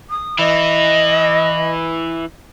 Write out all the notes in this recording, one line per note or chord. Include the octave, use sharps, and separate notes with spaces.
D#6
E3 E4 D#5